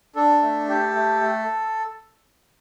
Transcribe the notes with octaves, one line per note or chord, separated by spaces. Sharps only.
D4 A4
A3
G4
A3
A3